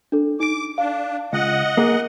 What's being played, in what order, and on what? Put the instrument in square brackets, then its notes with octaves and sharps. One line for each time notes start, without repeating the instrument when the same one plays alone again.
[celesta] D4 A4
[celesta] D#4 D7 [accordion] D6
[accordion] D4 [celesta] F5
[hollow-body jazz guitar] C#2 [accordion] D#5 F#5
[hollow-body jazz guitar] A#3 G#4 A#4